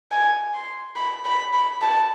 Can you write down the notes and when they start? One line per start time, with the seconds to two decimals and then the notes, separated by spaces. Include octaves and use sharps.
0.11 G#5
0.54 C6
0.96 B5
1.25 B5
1.53 B5
1.82 A5